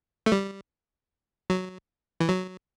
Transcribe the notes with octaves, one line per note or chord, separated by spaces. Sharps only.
A3
G3
F#3
E3
F#3